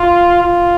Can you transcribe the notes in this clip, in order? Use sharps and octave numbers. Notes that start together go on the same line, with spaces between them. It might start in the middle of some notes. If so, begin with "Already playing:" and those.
Already playing: F4
F4